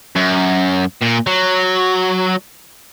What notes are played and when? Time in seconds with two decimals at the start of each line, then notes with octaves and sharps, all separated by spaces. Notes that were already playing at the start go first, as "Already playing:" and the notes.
0.16 F#2
1.02 A#2
1.27 F#3